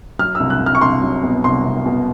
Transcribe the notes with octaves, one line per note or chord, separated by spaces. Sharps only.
F#3 F6
E6
C2
F#6
C2
F6
C#6
C2 C6
F#3
B2
C2 C6
C2
B2